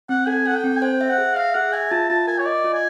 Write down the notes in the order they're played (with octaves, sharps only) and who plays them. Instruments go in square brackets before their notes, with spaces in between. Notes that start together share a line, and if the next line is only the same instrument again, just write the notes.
[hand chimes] C4 [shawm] F#5
[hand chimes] A4 [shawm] G#5
[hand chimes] A4 [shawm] F#5
[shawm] G5
[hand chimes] C4
[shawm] G#5
[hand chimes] C5 [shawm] G5
[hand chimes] E5
[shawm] F#5
[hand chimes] G#4
[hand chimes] E5 [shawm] F5
[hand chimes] G#4 [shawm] F#5
[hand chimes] E5 [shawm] G#5
[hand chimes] F4 [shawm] A5
[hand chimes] F4 [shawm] A5
[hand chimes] A#4 [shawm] G#5
[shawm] C#5
[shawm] D5 [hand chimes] D#5
[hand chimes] F4
[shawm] G#5